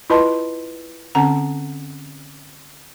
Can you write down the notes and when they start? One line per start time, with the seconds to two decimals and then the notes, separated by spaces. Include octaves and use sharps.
0.10 E4 F4 B4 D#5 A5 C6
1.15 D3 C4 C#4 F#5 A#5